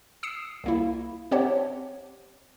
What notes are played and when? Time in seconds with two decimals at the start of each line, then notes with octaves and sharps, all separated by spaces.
0.23 D#6 E6 C7 C#7 E7
0.64 C2 A#3 E4
1.31 C4 G4 C5 C#5 F#5 A5